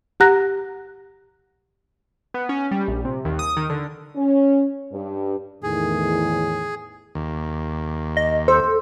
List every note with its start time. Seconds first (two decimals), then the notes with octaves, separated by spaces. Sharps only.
0.20 G4 F#5 A#5 F#6 A#6
2.34 B3
2.49 C#4
2.71 G3
2.88 A#1
3.05 C3
3.25 D#2
3.39 D#6
3.57 D#3
3.70 D3
4.16 C#4
4.91 G2
5.63 E2 A2 D#3 G#4
7.15 D#2
8.17 D#5
8.48 A4 C5